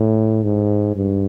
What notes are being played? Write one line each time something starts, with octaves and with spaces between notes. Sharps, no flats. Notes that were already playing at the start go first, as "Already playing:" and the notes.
Already playing: A2
G#2
G2